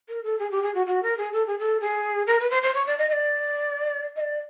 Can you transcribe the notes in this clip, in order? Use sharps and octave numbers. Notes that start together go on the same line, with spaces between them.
A#4
A4
G#4
G4
G#4
F#4
F#4
A#4
G#4
A4
G#4
A4
G#4
A#4
B4
C5
C5
C#5
D5
D#5
D#5
D5
D#5
D5